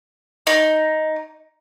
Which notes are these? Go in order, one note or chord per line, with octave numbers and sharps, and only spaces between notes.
D#4